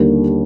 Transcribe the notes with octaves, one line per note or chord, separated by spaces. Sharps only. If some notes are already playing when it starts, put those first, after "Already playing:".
Already playing: D#2 D3 G3 A#3